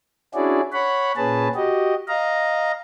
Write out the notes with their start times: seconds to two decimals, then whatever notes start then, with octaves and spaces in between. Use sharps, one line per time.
0.35 C#4 D4 E4 F#4 G#4 D5
0.73 C#5 F#5 B5
1.17 A#2 C#4 G#4 B4 A5
1.55 F#4 G4 D#5
2.08 D#5 F5 A#5